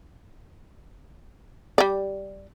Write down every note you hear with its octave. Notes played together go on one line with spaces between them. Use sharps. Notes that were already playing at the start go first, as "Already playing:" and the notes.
G3 D5